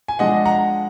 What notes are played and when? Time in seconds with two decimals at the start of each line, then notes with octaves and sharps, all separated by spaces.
0.08 G#5
0.19 F3 G#3 D4 D#5 F#5
0.46 F#5 A#5